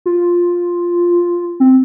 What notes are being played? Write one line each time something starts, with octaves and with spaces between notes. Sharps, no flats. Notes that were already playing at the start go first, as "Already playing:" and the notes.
F4
C4